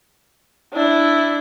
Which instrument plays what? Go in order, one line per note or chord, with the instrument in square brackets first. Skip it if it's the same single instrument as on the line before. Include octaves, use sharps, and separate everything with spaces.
[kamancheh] D4 E4